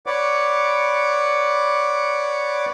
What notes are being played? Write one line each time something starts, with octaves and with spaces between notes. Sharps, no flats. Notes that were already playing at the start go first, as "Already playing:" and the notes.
B4 C#5 D5 F#5 D6